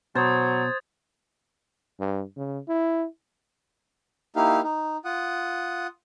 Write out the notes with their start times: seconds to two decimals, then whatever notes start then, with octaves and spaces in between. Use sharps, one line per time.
0.15 B2 F#3 C5 D#6 G#6 A6
2.00 G2
2.37 C#3
2.68 E4
4.36 A#3 D#4 E4 G4 F5
4.64 D#4
5.05 F4 F#5 D#6